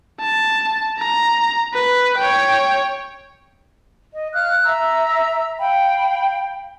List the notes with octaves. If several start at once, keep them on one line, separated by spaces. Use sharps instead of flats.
A5
A#5
B4
C#5 G5
D#5
F5 F6 F#6
E5 A#5 E6
F5 G5 B5